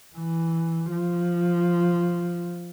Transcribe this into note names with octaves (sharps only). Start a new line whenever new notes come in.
E3
F3